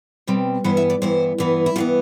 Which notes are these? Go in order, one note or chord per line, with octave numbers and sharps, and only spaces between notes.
B2 G3 C4
G2 E3 B3 C5
E5
D5
G2 E3 B3 C5
G2 E3 B3
E4
G2 E3 B3 F4